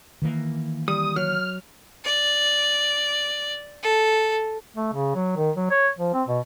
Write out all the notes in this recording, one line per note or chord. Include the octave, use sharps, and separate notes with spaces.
D#3 E3 A#3
G3 D#6
F#3 F6
D5
A4
A3
C#3
F#3
D#3
F#3
C#5
F3
C4
B2